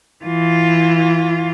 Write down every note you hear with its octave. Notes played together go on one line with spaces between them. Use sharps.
E3 F4